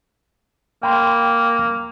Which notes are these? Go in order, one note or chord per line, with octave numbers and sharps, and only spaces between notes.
A#3 G5 B5 C6